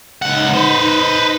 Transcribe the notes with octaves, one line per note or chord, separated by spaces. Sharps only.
C#2 D#4 F#5
B4 C5